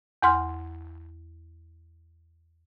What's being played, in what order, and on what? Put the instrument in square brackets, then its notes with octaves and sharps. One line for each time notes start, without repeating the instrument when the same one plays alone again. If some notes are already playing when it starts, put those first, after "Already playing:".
[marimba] E2 F#5 C6 F6